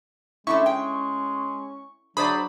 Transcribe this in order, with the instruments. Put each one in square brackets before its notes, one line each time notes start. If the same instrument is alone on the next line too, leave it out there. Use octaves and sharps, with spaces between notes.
[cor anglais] G#3 [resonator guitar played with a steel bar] A3 D4 E4 [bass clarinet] C#4 [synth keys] C#6
[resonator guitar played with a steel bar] G5
[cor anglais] F#3 [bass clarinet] D4 [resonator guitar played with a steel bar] G#4 C5 D5 [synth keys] B5